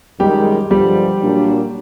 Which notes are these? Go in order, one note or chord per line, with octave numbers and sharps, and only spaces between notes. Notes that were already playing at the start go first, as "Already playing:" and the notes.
F#2 D#3 G3 G#3 G4
G2 D3 F3 G3 G4
A#2 F#3 A#3 D4